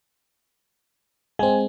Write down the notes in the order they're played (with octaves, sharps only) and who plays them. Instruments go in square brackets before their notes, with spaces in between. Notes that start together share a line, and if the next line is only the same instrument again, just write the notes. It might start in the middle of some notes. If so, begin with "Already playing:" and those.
[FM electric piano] G#3 C4 [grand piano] G#5